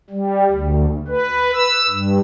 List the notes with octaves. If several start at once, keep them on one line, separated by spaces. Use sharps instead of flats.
G3
D2
B4
E6
G2